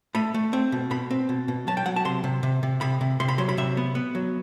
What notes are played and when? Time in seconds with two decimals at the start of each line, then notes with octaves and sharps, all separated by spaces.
0.15 A3 B5
0.34 A3
0.53 C4
0.72 B2
0.91 B2 B5
1.11 C4
1.29 B2
1.48 B2
1.67 F#3 A5
1.77 G5
1.86 F#3 F#5
1.96 A5
2.05 C3 C6
2.24 C3
2.43 C3
2.63 C3
2.81 C3 B5
3.01 C3
3.20 C3 C6
3.28 B5
3.38 F#3 C6
3.49 B5
3.57 C3 E5
3.77 B3
3.95 B3
4.15 F#3